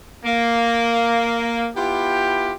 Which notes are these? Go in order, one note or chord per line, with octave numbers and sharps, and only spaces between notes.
A#3
B3 E4 F4 G4